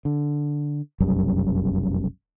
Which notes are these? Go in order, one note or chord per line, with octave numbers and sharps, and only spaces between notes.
D3
F1 B1 F#2 G3